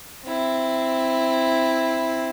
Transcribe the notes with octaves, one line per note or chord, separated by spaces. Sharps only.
C4 E4